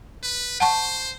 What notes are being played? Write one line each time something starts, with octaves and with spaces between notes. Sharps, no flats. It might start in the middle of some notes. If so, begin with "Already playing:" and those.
B4
C5 F#5 A5 C#6